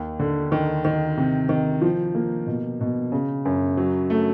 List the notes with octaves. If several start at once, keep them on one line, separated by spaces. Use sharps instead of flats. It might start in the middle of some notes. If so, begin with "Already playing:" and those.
Already playing: D#2
D3
D#3
D#3
C3
D#3
F3
A#3
B2
B2
C#3
F#2
F#3
A3